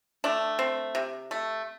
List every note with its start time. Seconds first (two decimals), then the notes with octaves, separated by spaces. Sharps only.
0.24 A3 D4
0.59 C4
0.95 C3
1.31 A3